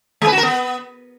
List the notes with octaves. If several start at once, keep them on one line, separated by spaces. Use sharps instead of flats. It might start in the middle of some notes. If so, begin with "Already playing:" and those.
G#3
B4
F#4
A#4
B3